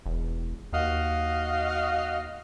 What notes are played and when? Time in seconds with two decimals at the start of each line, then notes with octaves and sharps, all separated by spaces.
0.06 E1
0.73 D#2 F#4 D#5 F5